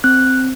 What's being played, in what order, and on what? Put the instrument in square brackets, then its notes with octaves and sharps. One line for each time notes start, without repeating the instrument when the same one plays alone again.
[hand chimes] C4 F#6